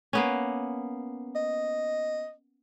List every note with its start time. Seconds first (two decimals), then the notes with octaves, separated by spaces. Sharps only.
0.13 A#3 B3 C#4
1.36 D#5